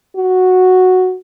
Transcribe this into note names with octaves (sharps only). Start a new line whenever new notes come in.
F#4